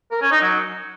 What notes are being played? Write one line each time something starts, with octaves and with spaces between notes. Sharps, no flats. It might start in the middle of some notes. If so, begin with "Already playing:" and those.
A#4
C#4
D#4
F#3